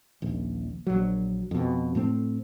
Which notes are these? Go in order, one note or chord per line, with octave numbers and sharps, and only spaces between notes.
D#1 A#1
A#1 F#3
F2 B2
A2 A3 C4